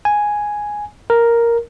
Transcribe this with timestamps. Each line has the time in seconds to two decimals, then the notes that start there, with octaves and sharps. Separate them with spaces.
0.05 G#5
1.10 A#4